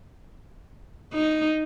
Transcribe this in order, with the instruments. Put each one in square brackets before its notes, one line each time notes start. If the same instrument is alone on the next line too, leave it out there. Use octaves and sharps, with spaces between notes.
[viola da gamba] D#4